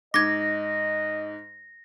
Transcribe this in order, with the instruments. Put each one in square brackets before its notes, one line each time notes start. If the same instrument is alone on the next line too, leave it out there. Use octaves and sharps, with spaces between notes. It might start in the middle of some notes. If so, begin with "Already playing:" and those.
[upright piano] G#2 [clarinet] D#5 [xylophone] D6 G#6 [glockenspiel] A#6